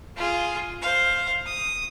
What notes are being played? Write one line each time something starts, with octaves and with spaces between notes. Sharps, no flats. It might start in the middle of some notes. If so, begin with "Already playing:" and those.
F4 G#4
C5 F5
D#6